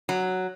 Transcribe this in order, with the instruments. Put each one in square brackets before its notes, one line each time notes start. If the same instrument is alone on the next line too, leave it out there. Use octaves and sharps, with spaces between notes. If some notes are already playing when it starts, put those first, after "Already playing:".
[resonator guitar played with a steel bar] F#3